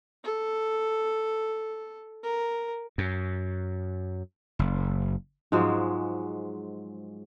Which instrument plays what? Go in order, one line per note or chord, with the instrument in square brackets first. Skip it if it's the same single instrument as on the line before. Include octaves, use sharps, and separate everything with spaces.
[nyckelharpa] A4
A#4
[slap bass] F#2
F#1
[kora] G#2 F3 F#3 G#3